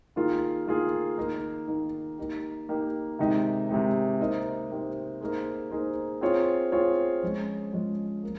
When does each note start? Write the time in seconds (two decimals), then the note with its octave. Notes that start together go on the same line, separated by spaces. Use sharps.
0.16 D#3 A#3 F4 G#4
0.67 D#3 A#3 F4 G#4
1.18 D#3 A#3 D#4
1.68 D#3 A#3 D#4
2.18 A#3 D#4 G4
2.69 A#3 D#4 G4
3.19 C3 D#3 G#3 D#4 G4
3.69 C3 D#3 G#3 D#4 G4
4.20 A#3 D#4 G4 C5 D#5
4.70 A#3 D#4 G4 C5 D#5
5.21 A#3 D#4 G#4 C5
5.71 A#3 D#4 G#4 C5
6.21 C4 F4 G#4 C#5
6.72 C4 F4 G#4 C#5
7.23 F3 G#3 C#4
7.73 F3 G#3 C#4
8.23 A#3